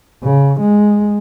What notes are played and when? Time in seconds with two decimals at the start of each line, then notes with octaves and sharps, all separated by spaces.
0.24 C#3
0.60 G#3